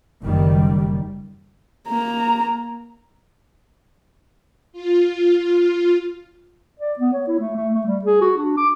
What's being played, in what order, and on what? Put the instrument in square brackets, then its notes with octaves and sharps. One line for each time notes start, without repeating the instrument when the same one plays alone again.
[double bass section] F#1 D#3 G3
[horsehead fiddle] A#3 A#5
[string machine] F4
[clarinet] D5
B3
C#5
E4
A3
A3
A3
G3
G#4
F#4
D4
D6